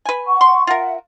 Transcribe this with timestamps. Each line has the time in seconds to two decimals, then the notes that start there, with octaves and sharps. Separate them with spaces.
0.05 B4 G#5
0.25 F#5 C#6
0.41 C6
0.67 F4 A#4 E5 F#5